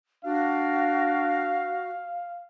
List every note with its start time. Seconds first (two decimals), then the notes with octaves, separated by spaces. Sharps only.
0.25 D4 F#4 F5